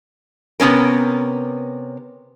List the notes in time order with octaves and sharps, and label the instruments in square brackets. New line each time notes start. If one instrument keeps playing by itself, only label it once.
[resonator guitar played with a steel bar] C3 B3 C#4 A#4